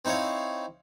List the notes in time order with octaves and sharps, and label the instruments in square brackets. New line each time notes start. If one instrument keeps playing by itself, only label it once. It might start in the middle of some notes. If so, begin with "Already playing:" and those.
[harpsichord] C4 D#4 E4 C#5 F5